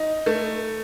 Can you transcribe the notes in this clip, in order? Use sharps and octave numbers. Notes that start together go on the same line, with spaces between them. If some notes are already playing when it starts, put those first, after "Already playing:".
Already playing: D#4
A3